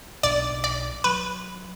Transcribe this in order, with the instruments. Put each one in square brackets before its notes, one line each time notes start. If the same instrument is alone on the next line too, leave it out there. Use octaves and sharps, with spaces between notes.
[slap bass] B1 B2 F#3 D4 [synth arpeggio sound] D5
[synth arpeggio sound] D5
[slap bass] F#3 [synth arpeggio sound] B4